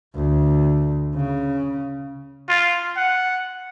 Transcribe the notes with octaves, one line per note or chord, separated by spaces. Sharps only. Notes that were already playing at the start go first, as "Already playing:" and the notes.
D2
C#3
F4
F#5